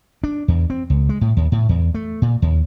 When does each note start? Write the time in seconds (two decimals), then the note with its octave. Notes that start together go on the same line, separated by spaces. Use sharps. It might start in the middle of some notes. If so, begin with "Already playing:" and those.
0.24 D4
0.48 E2
0.70 C4
0.90 C#2
1.09 G#3
1.21 A2
1.37 D#2
1.52 A2
1.69 E2
1.94 A3
2.22 A#2
2.42 D#2